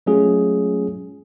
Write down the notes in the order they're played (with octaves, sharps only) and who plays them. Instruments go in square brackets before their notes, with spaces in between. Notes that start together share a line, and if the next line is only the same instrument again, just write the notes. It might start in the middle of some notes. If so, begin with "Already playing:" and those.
[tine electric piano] F#3 G#3 A3 C#4 F4 G#4